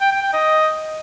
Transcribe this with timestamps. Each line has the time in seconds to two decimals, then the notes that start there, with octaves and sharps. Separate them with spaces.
0.01 G5
0.12 G5
0.22 G5
0.33 D#5